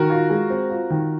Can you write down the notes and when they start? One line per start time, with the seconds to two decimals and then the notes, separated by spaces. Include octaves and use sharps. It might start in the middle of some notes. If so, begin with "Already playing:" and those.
Already playing: D#3 F#4 A#4
0.10 F4
0.30 G#3
0.50 C4
0.70 F4
0.90 D#3